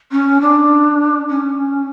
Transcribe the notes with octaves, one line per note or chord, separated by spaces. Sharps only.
C#4
D4
C#4